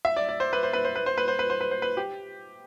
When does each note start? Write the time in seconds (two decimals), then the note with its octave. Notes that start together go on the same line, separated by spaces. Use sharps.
0.05 E5
0.16 D5
0.29 D5
0.40 C5
0.53 B4
0.63 C5
0.73 B4
0.85 C5
0.95 B4
1.06 C5
1.18 B4
1.28 C5
1.39 B4
1.50 C5
1.61 B4
1.71 C5
1.82 B4
1.97 G4